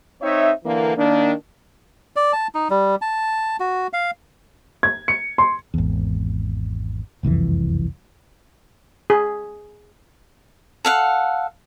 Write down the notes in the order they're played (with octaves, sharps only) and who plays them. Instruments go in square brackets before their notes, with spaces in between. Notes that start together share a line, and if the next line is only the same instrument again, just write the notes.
[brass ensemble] C4 D#4 C#5 E5
D3 E3 A#3
D#3 A#3 D4
[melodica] D5
A5
D#4
G3
A5
F#4
F5
[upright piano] G#6
C#7
C6
[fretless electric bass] G#1 E2
F#1 C2 F2 E3
[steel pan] G#4
[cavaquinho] A4 F5 F#5